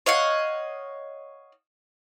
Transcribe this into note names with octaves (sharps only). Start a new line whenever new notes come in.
C#5 D#5 F5 F#5